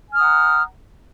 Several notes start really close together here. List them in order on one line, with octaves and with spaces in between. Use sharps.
G#5 F6 D#6 F#5 A#5